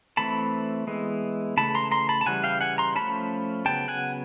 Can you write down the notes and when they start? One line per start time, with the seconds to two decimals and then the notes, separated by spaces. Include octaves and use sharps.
0.17 E3 A3 C4 A5 B5
0.87 E3 G#3 B3
1.57 C#3 E3 A3 A5 B5
1.75 A#5 C6
1.91 A#5 C6
2.09 A5 B5
2.21 A5
2.26 C#3 E3 G3 F#5 G#5
2.44 F5 G5
2.61 F#5 G#5
2.78 A#5 C6
2.95 F3 A3 C#4 A5 B5
3.65 C#3 F#3 B3 G5 A5
3.88 F#5 G#5